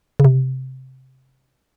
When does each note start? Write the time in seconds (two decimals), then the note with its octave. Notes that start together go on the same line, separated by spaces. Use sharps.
0.20 C#3
0.25 C3